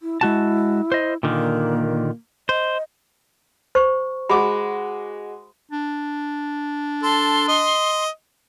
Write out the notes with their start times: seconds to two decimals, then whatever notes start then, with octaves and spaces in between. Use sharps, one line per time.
0.02 E4
0.21 G#3 E4 F#4 A5
0.92 C5 D#5
1.23 A#2 D3 D#3 A#3
2.49 C5 D#5
3.75 C5 C#6
4.29 G#3 F#4 B5 D6
5.72 D4
7.03 A4 C6
7.48 D#5